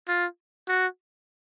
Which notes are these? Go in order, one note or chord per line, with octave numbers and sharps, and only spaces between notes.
F4
F#4